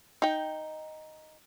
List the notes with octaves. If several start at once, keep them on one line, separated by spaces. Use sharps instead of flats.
D#4 G5